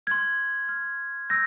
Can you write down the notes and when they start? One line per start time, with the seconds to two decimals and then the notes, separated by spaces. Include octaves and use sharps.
0.07 C6 F6 G#6
0.68 C6 F6
1.30 E6 G6 A#6